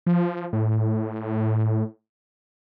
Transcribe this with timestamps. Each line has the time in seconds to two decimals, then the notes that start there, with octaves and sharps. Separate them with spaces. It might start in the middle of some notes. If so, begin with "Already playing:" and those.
0.07 F3
0.53 A2